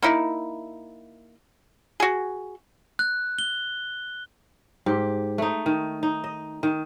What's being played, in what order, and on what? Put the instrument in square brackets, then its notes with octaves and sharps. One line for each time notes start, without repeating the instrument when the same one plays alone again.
[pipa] A#3 D#4 E4
F#4 G#4
[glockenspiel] F#6
G7
[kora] G#2 G4
A3 D#4
D#3
D#4
D#5
D#3